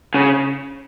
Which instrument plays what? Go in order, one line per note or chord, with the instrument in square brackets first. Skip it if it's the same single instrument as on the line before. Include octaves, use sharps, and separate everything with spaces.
[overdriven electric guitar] C#3